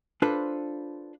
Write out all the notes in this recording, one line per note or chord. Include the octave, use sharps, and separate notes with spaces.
D4 F4 A4 B4 C5